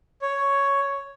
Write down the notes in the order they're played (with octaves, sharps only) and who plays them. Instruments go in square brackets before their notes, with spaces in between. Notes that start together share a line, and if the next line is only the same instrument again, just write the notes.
[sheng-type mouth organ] C#5